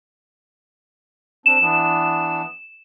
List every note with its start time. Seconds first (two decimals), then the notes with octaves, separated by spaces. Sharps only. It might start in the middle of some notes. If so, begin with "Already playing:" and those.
1.46 C4 D4 E7
1.61 E3 B3 D4